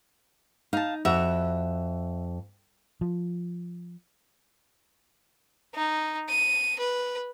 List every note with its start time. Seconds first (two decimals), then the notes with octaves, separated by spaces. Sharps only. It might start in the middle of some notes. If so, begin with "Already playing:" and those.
0.73 D#4 F5 A5
1.05 F2 F#4 E5
3.01 F3
5.75 D#4
6.29 D#7
6.79 B4